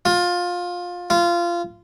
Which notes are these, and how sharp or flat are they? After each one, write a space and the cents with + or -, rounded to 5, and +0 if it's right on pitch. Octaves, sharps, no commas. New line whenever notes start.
F4 +20
F4 -20